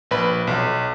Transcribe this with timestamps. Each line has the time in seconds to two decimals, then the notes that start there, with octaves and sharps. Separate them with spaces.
0.11 A#1 B4 B5
0.47 B1